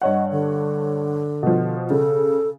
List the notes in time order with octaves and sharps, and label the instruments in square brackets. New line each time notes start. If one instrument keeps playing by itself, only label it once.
[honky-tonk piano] G2 C#5 F#5 [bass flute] D#5
[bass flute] D3
[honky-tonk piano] B2 F3
[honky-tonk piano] C#3 [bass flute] A4